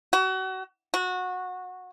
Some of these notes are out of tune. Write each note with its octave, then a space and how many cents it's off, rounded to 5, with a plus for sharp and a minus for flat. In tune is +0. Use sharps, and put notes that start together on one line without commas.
F#4 +30
F#4 -20